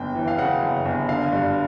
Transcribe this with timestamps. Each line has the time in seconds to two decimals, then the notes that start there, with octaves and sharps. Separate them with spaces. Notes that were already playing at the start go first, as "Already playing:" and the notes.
Already playing: G1 F#2 G5
0.15 E3
0.28 F5
0.38 C#3 F#5
0.62 F#2
0.85 G1
1.09 D3 F5
1.32 G2